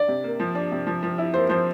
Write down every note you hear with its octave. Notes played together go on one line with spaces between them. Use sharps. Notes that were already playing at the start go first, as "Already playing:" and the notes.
Already playing: D4 D5
C3
A#3
F3
D4
C3
F3
F3
E4
A#3 C5
F3 C5